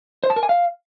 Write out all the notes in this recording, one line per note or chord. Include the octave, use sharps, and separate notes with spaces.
C5
A5
A#4
G#5
F5